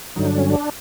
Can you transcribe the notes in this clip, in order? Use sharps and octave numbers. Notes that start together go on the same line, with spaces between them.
G2 D3 F#3 D#4
D4
C#4
D4